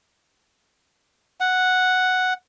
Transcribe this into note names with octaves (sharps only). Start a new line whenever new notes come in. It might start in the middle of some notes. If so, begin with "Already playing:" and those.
F#5